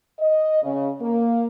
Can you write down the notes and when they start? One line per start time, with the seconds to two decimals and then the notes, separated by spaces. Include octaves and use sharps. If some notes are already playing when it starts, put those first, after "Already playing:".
0.20 D#5
0.63 C#3
1.01 A#3